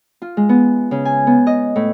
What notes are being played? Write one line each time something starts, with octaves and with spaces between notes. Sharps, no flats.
F4
G#3
B3
C#3
G#5
B3
D#5
A2